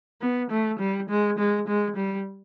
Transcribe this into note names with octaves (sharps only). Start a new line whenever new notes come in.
B3
A3
G3
G#3
G#3
G#3
G3